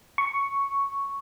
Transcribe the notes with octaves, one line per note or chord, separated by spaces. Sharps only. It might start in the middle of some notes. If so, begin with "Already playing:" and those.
C#6